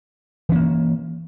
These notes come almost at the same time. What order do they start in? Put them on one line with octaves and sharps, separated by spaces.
E3 C#4 A#3